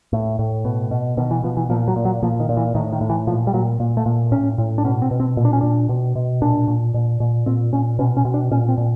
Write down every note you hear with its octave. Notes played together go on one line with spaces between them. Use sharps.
A2
A2
B2
B2
B2 D#3
E3
B2 F3
E3
A#2 F3
F#3
A#2
F#3
A#2 F3
D#3
A#2
E3
A2 D#3
D#3
A2
E3
A#2 F3
G3
A#2 F#3
A#2
A3
A#2
A2 C#4
A2
D4
B2 C#4
C4
B2
C4
A#2
D4
C#4
A#2 D4
B2
B2
A#2 D4
A#2
A#2
A#2
A#2 C4
A#2 C#4
B2 C#4
C#4
B2
D4
A#2 C#4
C4
A#2